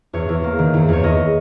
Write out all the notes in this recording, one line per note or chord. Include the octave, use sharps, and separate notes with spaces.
E2 C#5
E2
A#3
D#3
E2
E2 C#5
E2 D#5